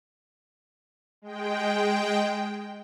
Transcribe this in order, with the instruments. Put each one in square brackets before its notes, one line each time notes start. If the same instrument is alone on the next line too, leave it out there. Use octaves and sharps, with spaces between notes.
[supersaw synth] G#3 G5